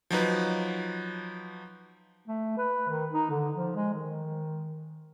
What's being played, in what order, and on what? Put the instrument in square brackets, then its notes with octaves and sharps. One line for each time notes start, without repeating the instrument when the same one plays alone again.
[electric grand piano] F3 F#3 D#4 B4
[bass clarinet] A3
B4
D#3
D#4
D3
F3
G#3
D#3